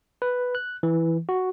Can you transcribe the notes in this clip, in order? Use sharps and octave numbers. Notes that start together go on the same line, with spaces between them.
B4
F#6
E3
F#4